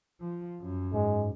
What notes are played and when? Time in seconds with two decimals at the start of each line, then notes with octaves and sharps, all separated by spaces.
0.20 F3
0.61 F#2
0.94 G#2 G#3